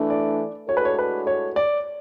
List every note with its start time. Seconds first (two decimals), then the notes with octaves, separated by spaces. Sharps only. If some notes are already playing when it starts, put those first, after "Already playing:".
Already playing: E3 A3 D4
0.10 D5
0.68 A2 G#3 D4 F#4 A4 C#5
0.77 B4
0.85 C#5
0.99 B4
1.27 C#5
1.56 D5